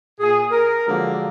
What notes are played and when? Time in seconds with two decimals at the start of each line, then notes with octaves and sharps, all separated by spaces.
0.20 A#2 G#4
0.51 A#4
0.87 D3 F3 F#3 G#3 A#3